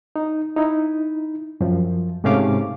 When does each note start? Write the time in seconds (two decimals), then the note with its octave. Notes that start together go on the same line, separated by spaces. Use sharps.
0.16 D#4
0.56 D#4 E4
1.61 F#2 F3
2.24 G#2 C3 A3 C#4 F5 D6